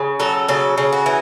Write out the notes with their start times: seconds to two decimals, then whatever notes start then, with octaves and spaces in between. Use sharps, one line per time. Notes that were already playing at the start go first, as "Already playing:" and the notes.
Already playing: C#3
0.20 F#3 A4
0.48 C#3 A4
0.78 C#3
0.93 F#4
1.06 E3